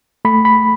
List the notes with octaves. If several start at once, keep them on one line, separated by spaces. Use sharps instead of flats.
A3 B5
B5